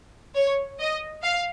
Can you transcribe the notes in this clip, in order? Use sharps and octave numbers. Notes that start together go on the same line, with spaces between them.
C#5
D#5
F5